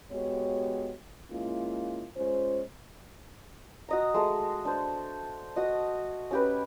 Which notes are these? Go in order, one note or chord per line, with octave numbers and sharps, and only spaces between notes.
G#3 B3 F#4 G4 C#5
G#3 A#3 C#4 E4 F4
G#3 C#4 F4 C5
F#4 D#5 A#5
G#3 A3 D#5
D4 C5
F#4 D#5
C#4 G4 B4